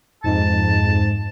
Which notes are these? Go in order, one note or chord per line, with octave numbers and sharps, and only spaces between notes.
F2 G#2 A5